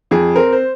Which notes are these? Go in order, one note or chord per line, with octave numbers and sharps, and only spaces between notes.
F2 G#4
C4 A#4
C5